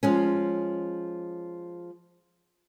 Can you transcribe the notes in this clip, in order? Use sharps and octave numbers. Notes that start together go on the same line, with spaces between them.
F3 G#3 C#4